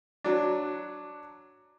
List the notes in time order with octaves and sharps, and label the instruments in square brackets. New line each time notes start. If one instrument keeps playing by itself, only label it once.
[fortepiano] F#3 D4